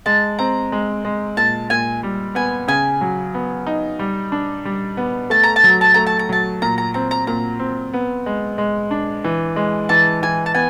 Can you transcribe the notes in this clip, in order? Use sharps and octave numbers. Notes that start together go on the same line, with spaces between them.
G#3 A5
C4 A#5
G#3
G#3
A#2 A5
A#2 G#5
G3
B3 G#5
C#3 G#5
F#3
B3
D#4
G3
D4
G3
B3
A3 A5
A#5
A5
F#3 A#5
A5
A3 A#5
A5
A#5
F#3 A5
A#2 A#5
A#5
C4 A#5
A#5
A#2 A#5
C4
B3
G#3
G#3
D4
E3
G#3
E3 A5
E3 G#5
A5
B3 G#5